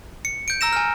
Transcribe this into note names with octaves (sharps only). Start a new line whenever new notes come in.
C#7
G6 D7
A#5 E6 A#6 E7
G#5 F6